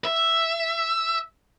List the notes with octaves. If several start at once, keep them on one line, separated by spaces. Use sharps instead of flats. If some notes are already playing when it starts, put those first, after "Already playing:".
E5